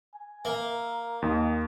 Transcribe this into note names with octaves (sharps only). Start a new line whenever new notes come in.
G#5
A#3 A#4 E5
D#2 D#5